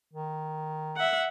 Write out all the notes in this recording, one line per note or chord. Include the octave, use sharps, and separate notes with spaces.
D#3
E5 F#5